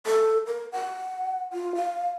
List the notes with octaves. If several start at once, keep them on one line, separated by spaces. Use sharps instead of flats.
A4
A#4
F#5
F4
F5